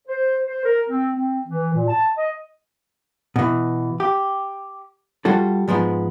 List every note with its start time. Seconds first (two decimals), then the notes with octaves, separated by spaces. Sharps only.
0.08 C5
0.47 C5
0.65 A#4
0.89 C4
1.14 C4
1.48 E3
1.74 A#2
1.88 A5
2.18 D#5
3.36 B2 E3
4.00 G4
5.25 G3 F4 F#4 A4
5.68 G#2 F3 G#3 B3